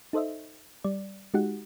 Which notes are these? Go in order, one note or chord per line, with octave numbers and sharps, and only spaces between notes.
D#4 A4 C5 D#5 E5
G3 D5
G#3 D#4 F#4 G4 F#5